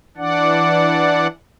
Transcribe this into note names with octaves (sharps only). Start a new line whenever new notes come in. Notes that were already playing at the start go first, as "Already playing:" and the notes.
E3 D4 D5 F#5